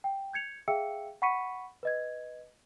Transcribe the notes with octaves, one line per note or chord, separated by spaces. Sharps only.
G5
G6 G#6 C#7 F7
G#4 E5 F5 G5 E6 C#7
F#5 B5 C#6 B6 C#7 D#7
B4 D#5 G#6